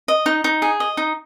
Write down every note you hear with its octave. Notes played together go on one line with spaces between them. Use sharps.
D#5
D#4
D#4
G#4
D#5
D#4